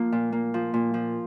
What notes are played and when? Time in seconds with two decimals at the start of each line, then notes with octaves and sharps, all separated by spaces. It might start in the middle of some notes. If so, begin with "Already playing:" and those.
Already playing: F3 A#3
0.12 A#2
0.32 A#3
0.54 F3
0.74 A#2
0.94 F3